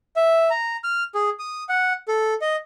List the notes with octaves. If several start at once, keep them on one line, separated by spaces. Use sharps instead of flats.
E5
A#5
F6
G#4
D#6
F#5
A4
D#5